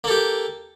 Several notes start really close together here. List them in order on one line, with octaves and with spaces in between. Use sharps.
A#3 A4 G4